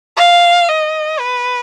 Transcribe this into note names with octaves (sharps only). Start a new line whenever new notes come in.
F5
D#5
B4